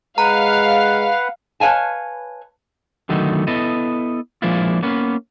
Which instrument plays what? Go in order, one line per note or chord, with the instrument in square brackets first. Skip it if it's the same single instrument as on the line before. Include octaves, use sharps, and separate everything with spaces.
[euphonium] G#3 [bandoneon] B4 F#5 [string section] F5 [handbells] A#5
[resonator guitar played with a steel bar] B4 C#5 F5 G#5 A5
[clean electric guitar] D3 D#3 F#3 A3 B3 D#4
B3 E4 A4 D#5
F3 G#3 A#3 D4 E4 F4
A#3 B3 C#4 B4